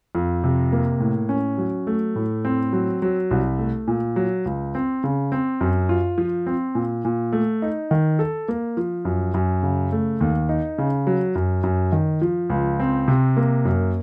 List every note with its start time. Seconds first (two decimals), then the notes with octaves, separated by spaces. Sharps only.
0.15 F2
0.44 C3
0.72 A#3
1.00 A2
1.29 C#4
1.58 F#3
1.87 A3
2.16 A2
2.45 C4
2.73 F#3
3.02 F#3
3.31 C2
3.59 A3
3.88 A#2
4.16 F#3
4.46 C#2
4.75 C4
5.04 C#3
5.32 C4
5.61 F#2
5.89 F4
6.18 F3
6.47 C4
6.75 A#2
7.05 A#2
7.33 A3
7.62 D#4
7.91 D#3
8.19 A4
8.48 A#3
8.77 F3
9.05 F#2
9.34 F#2
9.63 C#3
9.92 A3
10.21 D#2
10.49 D#4
10.78 C#3
11.07 F#3
11.35 F#2
11.63 F#2
11.92 D#3
12.22 F3
12.50 C#2
12.80 C4
13.08 C3
13.37 A#3
13.65 F#2